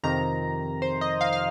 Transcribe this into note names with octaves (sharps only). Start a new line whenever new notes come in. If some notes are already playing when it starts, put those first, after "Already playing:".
F2 C3 D#3 A#5
C5
D#5
F5
F5